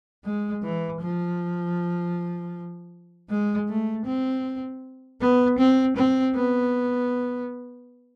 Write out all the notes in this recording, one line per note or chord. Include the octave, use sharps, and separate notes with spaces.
G#3
E3
F3
G#3
A3
C4
B3
C4
C4
B3